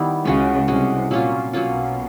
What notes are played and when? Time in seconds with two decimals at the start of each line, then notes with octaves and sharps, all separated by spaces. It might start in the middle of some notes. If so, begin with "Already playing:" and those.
Already playing: D#3 G3 B3 E4
0.25 C#2 C#3 G#3 C#4 F#4
0.67 C2 C3 G#3 C#4 F#4
1.10 A#2 F#3 A#3 C#4 F4
1.53 B1 B2 F#3 A#3 C#4 F4